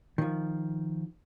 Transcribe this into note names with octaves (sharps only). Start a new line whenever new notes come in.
D#3 F3